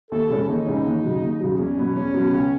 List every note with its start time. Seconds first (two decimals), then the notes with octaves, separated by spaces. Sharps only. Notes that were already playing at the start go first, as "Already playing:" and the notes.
0.11 D#2 A4
0.30 C#3 E3 G#3 C#4
0.48 D#2 D#4
0.66 C#3 E3 G#3 C#4
0.85 D#2
1.03 C#3 F#3
1.22 D#2
1.40 C#3 F#3
1.59 E2 C#4
1.77 B2 F#3 B3
1.95 E2 C#4
2.14 B2 F#3 B3
2.32 C#2